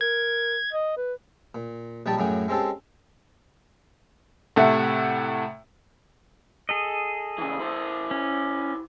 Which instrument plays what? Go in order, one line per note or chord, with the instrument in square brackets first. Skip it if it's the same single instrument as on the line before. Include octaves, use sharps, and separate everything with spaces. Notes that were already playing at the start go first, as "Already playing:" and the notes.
[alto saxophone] A#4 [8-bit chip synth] G#6
[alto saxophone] D#5
B4
[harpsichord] A#2
A#1 G3 D#4 C#5 G5 A5
F#2 A2 F#3 C#4 G#4 G5
G#3 C4 C#4 G4 A4
[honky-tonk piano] A2 C3 A3 E5 F#5
[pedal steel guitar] G#4 A4 D#5
[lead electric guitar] C#3 E3
E4 C5
[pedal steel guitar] C#4